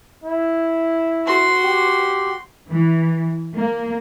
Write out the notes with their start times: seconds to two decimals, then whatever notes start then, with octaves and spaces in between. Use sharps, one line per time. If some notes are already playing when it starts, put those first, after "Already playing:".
0.24 E4
1.26 F#4 C6
1.64 G4
2.69 E3
3.56 A#3